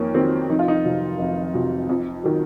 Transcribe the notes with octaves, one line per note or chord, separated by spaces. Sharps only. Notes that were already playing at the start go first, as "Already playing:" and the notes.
Already playing: F2 D#3 A#3 C#4
D#3 F#3 C4
F1 D#4
F4
D#4
F2 C3 F#3
F1
F2 C3 F#3
F2
D#3 F#3